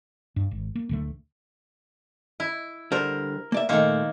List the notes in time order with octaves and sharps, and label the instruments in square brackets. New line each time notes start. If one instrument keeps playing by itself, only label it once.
[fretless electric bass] G2
G#1
A#3
D1 D3 A3
[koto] E4
[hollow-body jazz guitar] D3 G3 C5 [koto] A#4
[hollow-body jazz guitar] A#3 D5 E5
[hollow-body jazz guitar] A#2 A3 [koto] D#3 A#3 C5